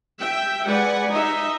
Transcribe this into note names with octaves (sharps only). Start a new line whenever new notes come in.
E5 G5
G#3 B4 D5 F#5 G#5
D#4 D#5 E5